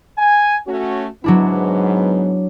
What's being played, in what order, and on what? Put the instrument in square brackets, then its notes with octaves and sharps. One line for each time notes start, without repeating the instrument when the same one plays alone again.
[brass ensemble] G#5
A3 C#4 F#4
[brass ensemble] G#2 B3 [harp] F#3 D4 E4